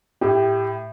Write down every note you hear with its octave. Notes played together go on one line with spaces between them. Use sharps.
A2 G4